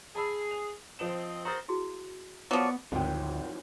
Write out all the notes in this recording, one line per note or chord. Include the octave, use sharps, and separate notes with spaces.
G#4 A5 B5 E6
F7
F3 C4 D#5 E7
F#4 A#4 C5 A#5 D#6 A6
E4 F#4 G#4
F3 F#3 B3 D5 C#6
G#1 D2 D#3 F3 F#3 G5